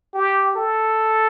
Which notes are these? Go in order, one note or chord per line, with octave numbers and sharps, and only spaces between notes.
G4
A4